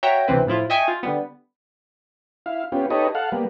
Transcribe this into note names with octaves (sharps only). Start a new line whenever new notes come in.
F#4 C#5 E5 G5 A#5
D2 C3 E3 C4 B4
A2 F3 E4 F4
D#5 E5 G5 G#5 C#6
F4
D3 G3 B3
E4 F5
B3 C#4 F4 G4
D#4 G4 A4 B4 C#5 D#5
A4 F5 F#5
G3 A#3 B3